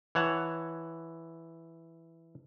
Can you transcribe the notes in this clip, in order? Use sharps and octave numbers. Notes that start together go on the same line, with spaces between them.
E3 C#5 F#5 A5